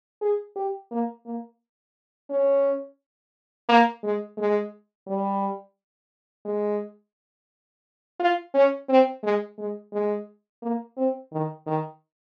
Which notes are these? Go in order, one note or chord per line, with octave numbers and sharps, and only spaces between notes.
G#4
G4
A#3
A#3
C#4
A#3
G#3
G#3
G3
G#3
F4
C#4
C4
G#3
G#3
G#3
A#3
C4
D#3
D#3